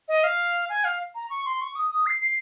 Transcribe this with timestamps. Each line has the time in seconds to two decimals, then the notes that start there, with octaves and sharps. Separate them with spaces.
0.08 D#5
0.24 F5
0.69 G#5
0.84 F5
1.15 A#5
1.30 C#6
1.46 C6
1.61 C#6
1.76 D#6
1.91 D#6
2.06 C7
2.22 C7